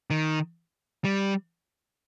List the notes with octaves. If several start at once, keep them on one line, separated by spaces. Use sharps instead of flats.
D#3
G3